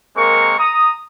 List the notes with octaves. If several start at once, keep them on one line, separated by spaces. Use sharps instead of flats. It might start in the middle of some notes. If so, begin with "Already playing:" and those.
G#3 A#3 C4 A#4 C#6
A#5 D#6